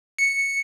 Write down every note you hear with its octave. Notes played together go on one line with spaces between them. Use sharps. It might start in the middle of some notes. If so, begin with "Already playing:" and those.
C#7